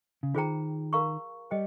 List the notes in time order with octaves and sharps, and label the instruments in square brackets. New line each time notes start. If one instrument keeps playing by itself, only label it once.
[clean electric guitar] C#3
[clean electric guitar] D#3 [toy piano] F4 G#4 C5 G5 A#5
[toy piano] A#4 F5 A#5 C#6
[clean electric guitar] G3 [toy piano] C5 D#5 G5